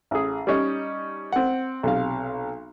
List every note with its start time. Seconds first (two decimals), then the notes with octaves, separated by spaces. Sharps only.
0.11 A1 G#4
0.47 G3 C#4 D#4
1.32 C4 F#5
1.83 B1 C3 F5